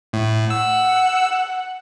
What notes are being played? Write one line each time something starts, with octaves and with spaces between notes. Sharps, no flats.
A2
F#5 E6